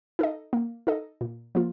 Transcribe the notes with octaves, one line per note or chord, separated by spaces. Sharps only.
D#4 A4 D#5
A#3
D#4 A4 D#5
A#2
F3 A#3 F4